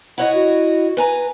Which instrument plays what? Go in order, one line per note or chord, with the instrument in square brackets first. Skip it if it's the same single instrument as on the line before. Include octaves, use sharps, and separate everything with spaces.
[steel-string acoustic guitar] E4 C#5 D#5 [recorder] F#5
[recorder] F#4
[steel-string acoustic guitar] B4 G#5 A#5